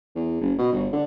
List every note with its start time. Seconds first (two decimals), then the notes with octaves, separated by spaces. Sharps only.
0.15 E2
0.41 F#1
0.58 B2
0.72 G1
0.93 D3